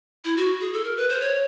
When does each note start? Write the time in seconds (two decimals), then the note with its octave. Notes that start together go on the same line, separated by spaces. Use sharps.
0.25 E4
0.37 F#4
0.61 G#4
0.73 A4
0.84 A#4
0.97 B4
1.09 C5
1.21 C#5